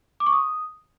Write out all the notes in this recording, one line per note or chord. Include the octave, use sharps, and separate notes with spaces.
D6
C#6
D#6